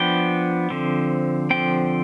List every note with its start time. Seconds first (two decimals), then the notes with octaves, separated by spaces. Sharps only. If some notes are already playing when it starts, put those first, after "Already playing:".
Already playing: F3 B3 D4 G5
0.70 D3 F3 C4
1.50 D3 F3 C4 G5